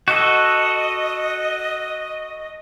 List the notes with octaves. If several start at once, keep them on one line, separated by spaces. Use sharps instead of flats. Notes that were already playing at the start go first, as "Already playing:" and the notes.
F#4 A4 D#5